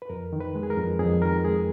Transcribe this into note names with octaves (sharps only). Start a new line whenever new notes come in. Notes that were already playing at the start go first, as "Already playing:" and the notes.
B4
F2 A#4
D#3
B4
G#3
G#4
A#4
F2
F2 G#4
D#3 A#4
G#3 G#4